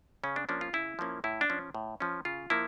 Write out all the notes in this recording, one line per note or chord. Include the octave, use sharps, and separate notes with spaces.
C#3 C#4
D4
F3 A#3 C#4 D4
F4
C#3 E4
F3 A#3 C#4
A2 E4
D4
F3 C#4
A2
F3 C#4
C#3 F4
F3 A#3 E4